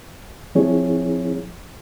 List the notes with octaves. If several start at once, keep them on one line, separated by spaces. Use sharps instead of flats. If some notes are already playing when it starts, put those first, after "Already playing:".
F3 C4 E4 G#4 C#5